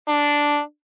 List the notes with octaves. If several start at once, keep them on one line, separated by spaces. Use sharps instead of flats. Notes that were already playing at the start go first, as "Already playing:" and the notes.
D4